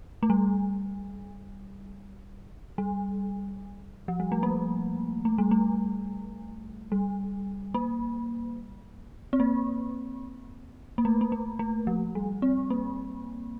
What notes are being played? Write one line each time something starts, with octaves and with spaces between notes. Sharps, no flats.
A3
G3
G3
F3
G3
A3
A#3
A3
G3
A3
G3
A#3
C4
A#3
A#3
A3
A#3
A3
A3
F3
G3
C4
A#3